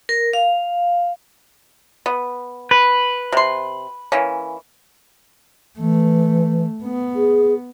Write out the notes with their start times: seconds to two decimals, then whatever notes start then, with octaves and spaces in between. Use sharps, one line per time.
0.09 A#4
0.33 F5
2.06 B3
2.71 B4
3.32 C3 C6
4.12 E3 A#3 C#4
5.79 E3 A3
6.84 B3
7.15 G#4